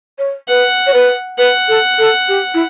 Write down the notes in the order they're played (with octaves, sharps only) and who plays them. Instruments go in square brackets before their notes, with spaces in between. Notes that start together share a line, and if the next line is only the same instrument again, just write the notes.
[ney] C#5
[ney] B4 [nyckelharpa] F#5
[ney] C#5
B4
[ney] B4 [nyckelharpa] F#5
[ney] A4
A4
G4
E4